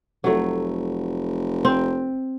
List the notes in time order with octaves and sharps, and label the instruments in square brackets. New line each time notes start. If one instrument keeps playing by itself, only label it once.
[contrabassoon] F1 [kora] F#3 A3
[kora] C4